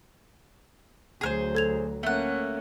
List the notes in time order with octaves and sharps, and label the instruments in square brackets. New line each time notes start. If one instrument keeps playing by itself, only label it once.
[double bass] D2 F#3 [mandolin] G#4 A#4 C5
[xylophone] A4 G#6 F7
[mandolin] A3 F#5 [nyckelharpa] A#3 C#4